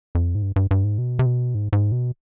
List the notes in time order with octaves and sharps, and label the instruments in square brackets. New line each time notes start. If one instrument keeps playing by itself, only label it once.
[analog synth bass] F2
G#2
G2
G2
G2
G#2
B2
C3
B2
G#2
G#2
B2